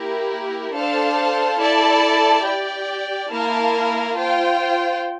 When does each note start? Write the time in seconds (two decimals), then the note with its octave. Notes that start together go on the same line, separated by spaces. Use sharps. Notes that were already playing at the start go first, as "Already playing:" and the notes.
Already playing: A#3 E4 G4 A#4
0.73 D4 A4 C5 F5 A5
1.58 E4 A4 D5 A5
2.43 G4 D5 G5
3.29 A#3 E4 A#4 F5 A5
4.15 F4 C5 G5